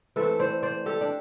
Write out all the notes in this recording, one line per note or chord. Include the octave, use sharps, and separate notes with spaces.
E3 A3 C4 A4 B4
C5 D5
C5 D5
G4 A4
D4